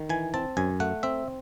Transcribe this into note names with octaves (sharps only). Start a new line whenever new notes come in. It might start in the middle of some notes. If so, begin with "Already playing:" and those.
Already playing: D#3
E3 G#5
C4 A5
F#2 G#5
A3 F#5
C4 E5